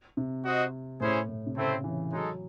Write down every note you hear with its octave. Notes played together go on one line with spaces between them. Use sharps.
C3
F#4 C5 D#5
A2 C#4 E4 G#4 C5
A2
C3
C#3 A3 C4 E4 C5
E3
F#3 G#3 D#4 A4